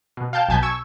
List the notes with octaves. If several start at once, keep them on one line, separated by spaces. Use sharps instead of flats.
B2
F5 G5 A5 G6
B1 B2 G#5 A5 G6 B6
C#6 E6 G#6